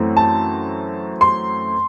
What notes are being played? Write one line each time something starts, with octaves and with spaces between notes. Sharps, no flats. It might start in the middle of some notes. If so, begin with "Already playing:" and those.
Already playing: F#2 E3 A3 C4
A5
C6